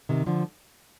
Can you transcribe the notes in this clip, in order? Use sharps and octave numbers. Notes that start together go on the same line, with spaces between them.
C3 D#3
D3 F3